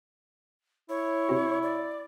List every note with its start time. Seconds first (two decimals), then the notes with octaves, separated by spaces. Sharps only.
0.89 E4 C#5
1.29 C3 C4 F#4
1.63 D5